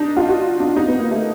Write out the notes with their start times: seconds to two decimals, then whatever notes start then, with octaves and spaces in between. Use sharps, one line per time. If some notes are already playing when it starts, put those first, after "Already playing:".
Already playing: D4 D#4
0.17 F4
0.29 F#4
0.60 D4
0.76 D#4
0.88 B3
0.99 A#3
1.11 A3